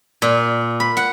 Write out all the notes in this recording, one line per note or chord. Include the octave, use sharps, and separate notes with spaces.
A#2
B5
F#5